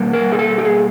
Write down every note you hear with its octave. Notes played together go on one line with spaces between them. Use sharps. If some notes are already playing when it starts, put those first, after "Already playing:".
Already playing: B2 G3 A#3
A#4
G#4
A4
G4
G#4